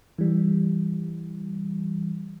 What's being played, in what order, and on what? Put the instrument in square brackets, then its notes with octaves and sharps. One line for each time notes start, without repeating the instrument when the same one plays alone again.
[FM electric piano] E3 G3